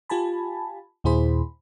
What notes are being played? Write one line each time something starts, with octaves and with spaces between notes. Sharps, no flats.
F4 G4 G#5 A5 B5
D#2 A#2 E4 G#4 C5 B5